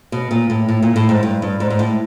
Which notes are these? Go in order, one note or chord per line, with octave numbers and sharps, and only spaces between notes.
B2
A#2
A2
A2
A#2
A2
G#2
G2
G2
G#2
G#2
A2